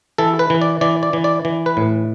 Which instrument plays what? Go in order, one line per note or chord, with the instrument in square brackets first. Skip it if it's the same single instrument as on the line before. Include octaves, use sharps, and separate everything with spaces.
[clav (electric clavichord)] E3 A4
B4
E3
D5
E3 D5
D5
E3
D5
E3
B4
A2